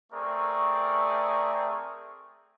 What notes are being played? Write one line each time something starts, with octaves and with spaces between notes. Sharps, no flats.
A3 C4 G#4 A#4 D5 C#6